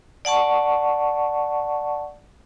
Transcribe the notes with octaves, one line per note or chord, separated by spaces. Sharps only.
D5 F#5 A5 C#6